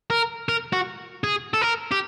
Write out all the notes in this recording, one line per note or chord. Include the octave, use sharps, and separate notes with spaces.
A#4
A#4
F#4
G#4
A4
A#4
G4